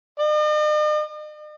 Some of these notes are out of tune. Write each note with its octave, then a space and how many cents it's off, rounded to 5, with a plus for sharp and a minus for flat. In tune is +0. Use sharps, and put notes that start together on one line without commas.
D#5 -45